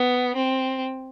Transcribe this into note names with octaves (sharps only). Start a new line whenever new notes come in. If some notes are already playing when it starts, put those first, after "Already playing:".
Already playing: B3
C4